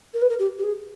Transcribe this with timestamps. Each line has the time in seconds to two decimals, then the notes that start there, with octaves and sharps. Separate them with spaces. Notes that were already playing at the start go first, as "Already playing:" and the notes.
0.13 A#4
0.21 B4
0.29 A#4
0.39 G4
0.58 G4
0.63 G#4